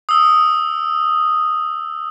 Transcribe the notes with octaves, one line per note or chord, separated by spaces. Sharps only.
D#6 E6